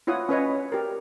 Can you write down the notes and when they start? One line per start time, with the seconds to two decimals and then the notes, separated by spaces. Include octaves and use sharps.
0.07 E4 F4 C#5 F#5 D#6
0.29 C#4 B4 C#5 D#5
0.72 G4 A#4